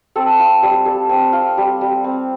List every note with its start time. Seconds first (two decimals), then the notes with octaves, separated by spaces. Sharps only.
0.16 C4 A4
0.40 F4
0.62 G3
0.86 G3 A4
1.09 C4
1.33 F4
1.58 G3
1.81 G3
2.04 C4